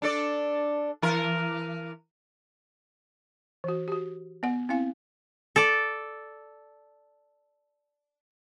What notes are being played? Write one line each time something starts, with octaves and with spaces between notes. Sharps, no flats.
D4 A4 D5
E3 A#4
E3 F#4
F#4 G4
B3 F#5
C4 E4 F5 G#5
A4 D5